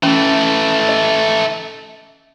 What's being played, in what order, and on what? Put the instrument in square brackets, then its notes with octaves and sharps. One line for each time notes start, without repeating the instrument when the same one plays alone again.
[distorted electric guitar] E3 A3 [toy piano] C#4
[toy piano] D#5